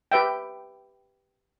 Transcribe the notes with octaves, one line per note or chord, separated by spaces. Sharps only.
G4 B4 E5 G5